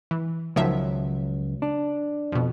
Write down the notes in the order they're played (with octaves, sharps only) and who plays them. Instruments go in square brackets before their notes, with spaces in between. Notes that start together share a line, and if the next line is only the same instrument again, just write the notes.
[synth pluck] E3
[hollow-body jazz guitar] C#2 F#3 [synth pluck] D#3 F3 E5
[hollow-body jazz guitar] D4
[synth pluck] F2 B2